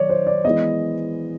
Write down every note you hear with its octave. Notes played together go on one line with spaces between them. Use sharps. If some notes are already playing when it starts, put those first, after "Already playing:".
Already playing: D#3 F#3 C#5 D5
C5
D5
E3 G#3 B3 D#5